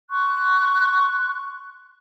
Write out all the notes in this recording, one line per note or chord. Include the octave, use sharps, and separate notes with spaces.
C6 C#6 F#6